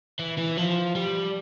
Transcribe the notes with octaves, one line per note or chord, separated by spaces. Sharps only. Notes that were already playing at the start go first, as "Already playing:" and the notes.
E3
E3
F3
G3